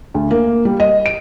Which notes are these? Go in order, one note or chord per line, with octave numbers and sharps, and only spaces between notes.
D2
A#3
G3
D#5
D7